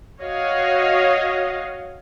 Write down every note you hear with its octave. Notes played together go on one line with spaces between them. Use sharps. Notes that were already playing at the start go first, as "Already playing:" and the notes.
F#4 C#5 D#5 F5